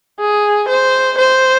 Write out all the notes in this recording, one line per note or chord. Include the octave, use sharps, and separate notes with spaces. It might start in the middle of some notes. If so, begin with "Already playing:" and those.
G#4
C5
C5